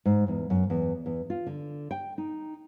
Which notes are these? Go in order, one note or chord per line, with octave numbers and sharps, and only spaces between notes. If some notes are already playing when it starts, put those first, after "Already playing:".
G#2
E2
F#2
E2
E2
F4
D3
G5
D#4